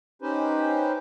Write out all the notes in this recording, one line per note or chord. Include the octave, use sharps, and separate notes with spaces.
C#4 D#4 G4 B4 C5